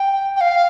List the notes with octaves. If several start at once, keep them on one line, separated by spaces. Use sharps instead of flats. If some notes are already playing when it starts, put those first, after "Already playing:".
Already playing: G5
G5
F5